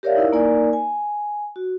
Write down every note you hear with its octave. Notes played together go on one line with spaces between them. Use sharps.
G4 A#4 C#5 D5 E5 F5
D#4 E4 A#4
A#3 D#4 A#4 D5 G#5
G#5
F#4